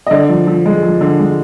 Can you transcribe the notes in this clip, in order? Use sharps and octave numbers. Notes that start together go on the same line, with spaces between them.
D#5
D3 D5
F3
F3
G#3
F3
D3
G#3